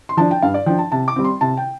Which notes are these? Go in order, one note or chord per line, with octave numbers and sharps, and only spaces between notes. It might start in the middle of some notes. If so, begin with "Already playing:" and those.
C6
F3 D4 A5
G5
G2 F5
D5
F3 D4 G5
A5
C3 A5
D6
G3 C4
C6
C3 A5
G5